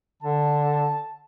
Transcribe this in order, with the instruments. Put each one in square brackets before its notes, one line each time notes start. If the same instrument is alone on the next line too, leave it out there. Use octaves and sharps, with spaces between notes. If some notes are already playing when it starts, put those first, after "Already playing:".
[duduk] D3 [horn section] A5